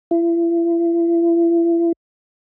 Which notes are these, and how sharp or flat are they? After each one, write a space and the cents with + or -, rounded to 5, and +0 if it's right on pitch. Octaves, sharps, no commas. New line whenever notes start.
E4 +40